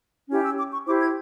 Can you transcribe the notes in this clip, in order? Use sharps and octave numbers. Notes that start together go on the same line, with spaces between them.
C#4 E4 G4
E6
D6
C#6
E4 G4 C5 D6
G#6